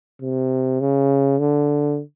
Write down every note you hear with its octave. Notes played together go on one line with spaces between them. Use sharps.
C3
C#3
D3